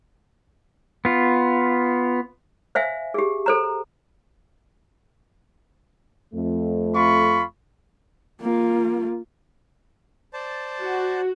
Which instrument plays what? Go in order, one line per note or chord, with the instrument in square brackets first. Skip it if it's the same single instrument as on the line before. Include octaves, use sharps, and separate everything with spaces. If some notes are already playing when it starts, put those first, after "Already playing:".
[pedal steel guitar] B3 F4
[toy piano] C5 E5 F5 G#5
G4 G#4
A4 C5 A#5
[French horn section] F2 A3
[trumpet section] F4 B5 C#6
[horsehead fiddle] A#3 F4
[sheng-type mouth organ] C5 D5 A5
[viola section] F#4